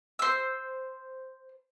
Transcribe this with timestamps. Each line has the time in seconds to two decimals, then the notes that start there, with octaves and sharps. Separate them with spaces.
0.19 C5 E6